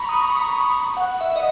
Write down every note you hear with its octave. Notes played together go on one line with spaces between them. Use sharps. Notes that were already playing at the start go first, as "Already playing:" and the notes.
Already playing: A#5 B5 C#6
D#6
C#6
B5
C#6
C#6
F#5
E5
D#5